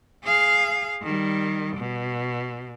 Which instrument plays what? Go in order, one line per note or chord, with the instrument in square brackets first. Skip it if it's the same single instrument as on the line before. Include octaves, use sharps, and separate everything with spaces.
[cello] G#4 F5
D#3 G3
B2